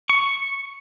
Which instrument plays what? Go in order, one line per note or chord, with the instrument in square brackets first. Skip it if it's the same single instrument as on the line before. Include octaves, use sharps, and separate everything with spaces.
[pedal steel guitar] C#6